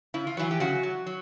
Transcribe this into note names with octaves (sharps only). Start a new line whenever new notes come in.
C#3 E4
F4
E3 F#3 E4
G4
C#3 F#3 F#4
F#3
F#3